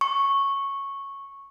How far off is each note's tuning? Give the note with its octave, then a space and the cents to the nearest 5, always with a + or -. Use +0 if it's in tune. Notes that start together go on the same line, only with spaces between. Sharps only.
C#6 -10